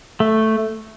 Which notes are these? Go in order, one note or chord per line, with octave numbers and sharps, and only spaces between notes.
A3